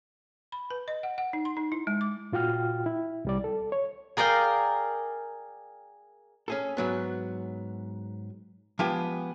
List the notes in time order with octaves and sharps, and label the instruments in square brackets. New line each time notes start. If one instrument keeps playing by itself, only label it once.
[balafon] B5
B4
D#5
F#5
F#5
D#4
C6
D#4
E4
G#3
D6
[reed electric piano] A#2 F4 F#4 G5 F6
E4
C2 G3 D5
A4
C#5
[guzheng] G#4 A#4 D5 F5 G5
[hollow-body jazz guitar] C#4 G#4 A4
G#2 F#3 B3
F3 G#3 B3 G4 G#5